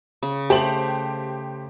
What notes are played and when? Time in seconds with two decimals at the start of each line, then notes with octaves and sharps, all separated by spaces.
0.23 C#3
0.50 A3 G4 A4 C5 F#7